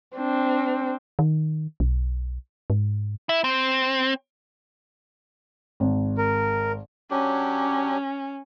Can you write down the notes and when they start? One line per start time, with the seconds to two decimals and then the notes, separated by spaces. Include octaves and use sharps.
0.17 C4 D4
1.19 D#3
1.80 B1
2.70 G#2
3.29 E4
3.44 C4
5.80 G#1
6.18 A#4
7.11 F#3 C#4 D4 G4